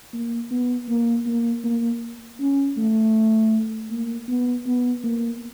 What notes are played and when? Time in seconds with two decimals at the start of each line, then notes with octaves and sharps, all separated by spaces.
0.13 A#3
0.51 B3
0.89 A#3
1.26 A#3
1.64 A#3
2.40 C#4
2.77 A3
3.90 A#3
4.28 B3
4.66 B3
5.04 A#3